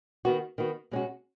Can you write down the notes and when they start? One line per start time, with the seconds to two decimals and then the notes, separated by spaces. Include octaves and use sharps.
0.25 D#3 B3 F#4
0.58 D#3 B3 F#4
0.91 B2 G#3 C#4 F#4